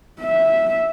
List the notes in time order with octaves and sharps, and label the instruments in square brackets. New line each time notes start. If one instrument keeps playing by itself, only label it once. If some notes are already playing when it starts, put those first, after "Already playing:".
[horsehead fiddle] E5